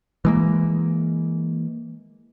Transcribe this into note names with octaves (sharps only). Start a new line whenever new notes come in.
E3 G#3 A#3